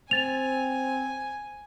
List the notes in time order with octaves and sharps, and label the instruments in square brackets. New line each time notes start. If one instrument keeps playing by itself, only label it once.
[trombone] C4 [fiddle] G#5 [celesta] A6 F7